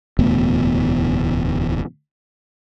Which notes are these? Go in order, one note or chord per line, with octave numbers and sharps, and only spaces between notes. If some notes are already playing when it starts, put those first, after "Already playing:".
D1 E2 B2 A3